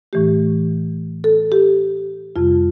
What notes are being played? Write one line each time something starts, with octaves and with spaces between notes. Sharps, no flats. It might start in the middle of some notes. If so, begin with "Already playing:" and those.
A2 E3 A3 G4
A4
G4
F2 C3 G3 F4